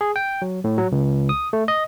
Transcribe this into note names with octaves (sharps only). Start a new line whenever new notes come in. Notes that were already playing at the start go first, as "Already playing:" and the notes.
G#4
G5
F#3
A2
F#3
C#2
D#6
A3
D#5